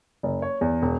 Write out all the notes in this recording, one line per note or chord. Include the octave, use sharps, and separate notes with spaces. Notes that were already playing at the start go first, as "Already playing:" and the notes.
F#1
C#5
E2
E1